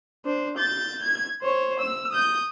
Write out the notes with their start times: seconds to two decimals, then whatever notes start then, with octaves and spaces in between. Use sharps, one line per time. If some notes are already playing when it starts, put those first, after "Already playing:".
0.25 D4 C5
0.57 G6 A6
1.02 G#6
1.42 C5 C#5
1.79 E6
2.12 D#6 G6